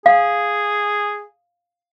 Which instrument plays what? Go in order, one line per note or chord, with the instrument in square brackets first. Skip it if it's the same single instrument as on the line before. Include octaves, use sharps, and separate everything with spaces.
[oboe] G#4 [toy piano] F5